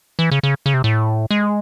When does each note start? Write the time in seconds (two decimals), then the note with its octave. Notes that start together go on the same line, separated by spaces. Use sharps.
0.19 E3
0.31 C#3
0.43 C#3
0.66 C#3
0.74 C3
0.84 A2
1.31 G#3